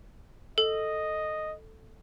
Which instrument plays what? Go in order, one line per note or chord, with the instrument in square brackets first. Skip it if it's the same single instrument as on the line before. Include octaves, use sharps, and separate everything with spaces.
[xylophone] A4 [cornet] D#5